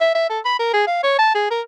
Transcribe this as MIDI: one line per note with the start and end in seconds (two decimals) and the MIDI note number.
0.01 0.11 76
0.15 0.29 76
0.30 0.40 69
0.45 0.55 83
0.59 0.72 70
0.74 0.83 68
0.87 1.03 77
1.03 1.14 73
1.19 1.32 81
1.35 1.50 68
1.51 1.61 70